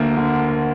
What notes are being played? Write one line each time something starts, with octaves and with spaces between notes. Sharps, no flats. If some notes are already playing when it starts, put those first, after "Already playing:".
Already playing: D2 A#3
D3